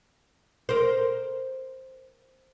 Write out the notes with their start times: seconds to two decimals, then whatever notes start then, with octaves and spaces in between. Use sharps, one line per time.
0.69 A#4 C5